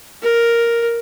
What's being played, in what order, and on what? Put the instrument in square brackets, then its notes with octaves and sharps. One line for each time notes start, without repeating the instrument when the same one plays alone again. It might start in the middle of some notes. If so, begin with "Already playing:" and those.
[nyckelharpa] A#4